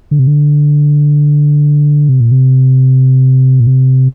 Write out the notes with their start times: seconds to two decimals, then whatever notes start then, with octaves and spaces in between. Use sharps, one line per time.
0.11 D3
0.19 C3
0.27 D3
2.09 C3
2.20 A#2
2.32 C3
3.60 A#2
3.67 C3